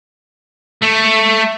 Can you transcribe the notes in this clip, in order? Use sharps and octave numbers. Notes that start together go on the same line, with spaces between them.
A3